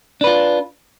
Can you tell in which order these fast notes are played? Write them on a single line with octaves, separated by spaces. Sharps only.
D4 B4 F4